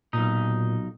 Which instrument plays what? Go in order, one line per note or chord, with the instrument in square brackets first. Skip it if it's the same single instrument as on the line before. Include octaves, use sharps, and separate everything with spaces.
[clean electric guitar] B1 D#4 [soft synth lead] A#2